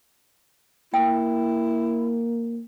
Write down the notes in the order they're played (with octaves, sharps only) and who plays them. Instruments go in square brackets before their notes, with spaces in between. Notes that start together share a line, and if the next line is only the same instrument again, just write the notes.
[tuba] A#3 [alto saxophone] E4 [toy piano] G5